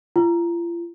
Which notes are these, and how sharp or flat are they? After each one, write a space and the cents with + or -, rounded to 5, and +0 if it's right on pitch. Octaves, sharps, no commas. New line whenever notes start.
F4 -40